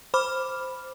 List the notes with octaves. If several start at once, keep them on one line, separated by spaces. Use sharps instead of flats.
C5 B5 D6 F6